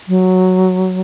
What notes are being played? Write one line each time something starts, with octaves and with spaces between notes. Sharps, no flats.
F#3